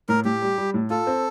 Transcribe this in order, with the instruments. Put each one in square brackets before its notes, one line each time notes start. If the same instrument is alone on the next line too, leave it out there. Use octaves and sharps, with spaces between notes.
[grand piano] A2 [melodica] A#4
[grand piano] A2 [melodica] G4
[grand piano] G3
G3
A2
[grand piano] F4 [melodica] A4
[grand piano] C4